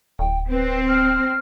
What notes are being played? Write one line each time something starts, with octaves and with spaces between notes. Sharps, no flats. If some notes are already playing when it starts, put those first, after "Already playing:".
D1 G5
C4 B4
F6